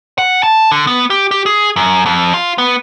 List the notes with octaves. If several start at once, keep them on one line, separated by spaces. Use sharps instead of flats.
F#5
A5
D3
B3
G4
G4
G#4
F#2
F2
F4
B3